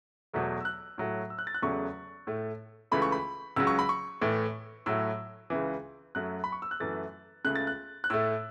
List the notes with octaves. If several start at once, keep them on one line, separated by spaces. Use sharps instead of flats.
E2 B2 F#3 A3
E6
F#6
A2 F#3 A3
E6
F#6
A6
F#6
E2 C#3 F#3 A3 C#6
A2 A3
C#2 C#3 E3 A3 B5
C#6
B5
C#2 C#3 F#3 E6
C#6
B5
C#6
A2 E3 A3
A2 F#3 A3 E6
C#2 C#3 E3
F#2 F#3 A3 F#6
B5
C#6
E6
F#6
F#2 E3 A3 A6
C#2 C#3 A3 F#6
A6
F#6
F#6
A2 A3 E6